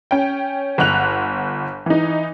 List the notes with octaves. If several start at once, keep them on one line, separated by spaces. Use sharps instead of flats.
C#4 G5
G1 F#5 F#6 F7
E3 D#4